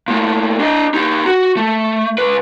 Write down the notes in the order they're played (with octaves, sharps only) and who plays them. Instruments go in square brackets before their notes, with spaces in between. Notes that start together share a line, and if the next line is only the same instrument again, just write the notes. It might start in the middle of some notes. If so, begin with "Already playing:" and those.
[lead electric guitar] A#2 A3
D4 D#5
D#4 G4
F#4
A3
C#2 B4